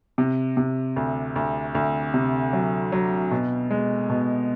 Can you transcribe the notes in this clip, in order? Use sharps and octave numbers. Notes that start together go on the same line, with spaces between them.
C3
C3
D2
D2
D2
C3
F#3
F#3
B2
G#3
B2